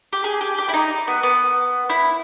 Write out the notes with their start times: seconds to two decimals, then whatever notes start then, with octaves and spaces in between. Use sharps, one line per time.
0.13 G4
0.24 G#4
0.41 G4
0.58 G4
0.68 E4
0.74 D#4
1.07 B3
1.23 B3
1.90 E4